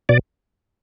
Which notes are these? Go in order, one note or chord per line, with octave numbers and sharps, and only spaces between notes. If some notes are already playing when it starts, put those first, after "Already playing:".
B2 D5